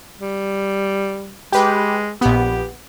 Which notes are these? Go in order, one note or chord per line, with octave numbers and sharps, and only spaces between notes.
G3
G#3 G4 B4
A#1 B3 G4